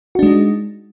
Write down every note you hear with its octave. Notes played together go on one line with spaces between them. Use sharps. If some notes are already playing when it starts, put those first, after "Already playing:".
G#3 D4 D#4 F#4